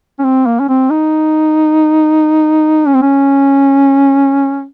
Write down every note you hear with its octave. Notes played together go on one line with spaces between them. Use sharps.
C#4
C4
A#3
C#4
C4
D#4
C#4
C4
C#4